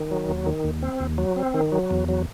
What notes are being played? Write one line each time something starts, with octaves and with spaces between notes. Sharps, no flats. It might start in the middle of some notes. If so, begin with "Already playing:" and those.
Already playing: D#3
F#3
D#2
D#3
D#2
C4
D#2
F#3
C4
D#3
F#3
E2
F#3